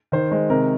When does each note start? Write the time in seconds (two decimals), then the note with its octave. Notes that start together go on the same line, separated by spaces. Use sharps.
0.12 D#3 C5
0.31 G#3 C5
0.50 C3 A#4